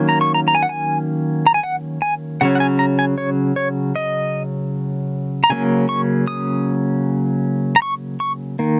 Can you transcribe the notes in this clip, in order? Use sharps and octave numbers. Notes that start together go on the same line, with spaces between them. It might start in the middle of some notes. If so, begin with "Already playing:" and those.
Already playing: D#3 F#3 A#3 C#4
A#5
C#6
A#5
A#5
G#5
F#5
G#5
A#5
G#5
F#5
G#5
C#3 F#3 C#4 F#5
F#5
G#5
A#5
G#5
C#5
C#5
D#5
A#5
C#3 F#3 A#3 C#4 G#5
C#6
D#6
A#5
C#6
C#6
D#3 A#3